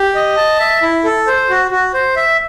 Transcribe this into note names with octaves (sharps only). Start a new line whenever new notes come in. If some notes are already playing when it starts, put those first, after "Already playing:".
Already playing: G4
D#5
A5
E5
E4
A4
C5
F#4
F#4
C5
E5